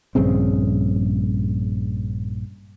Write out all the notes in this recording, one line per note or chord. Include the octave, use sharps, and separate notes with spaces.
A#1 G2 C#3 C4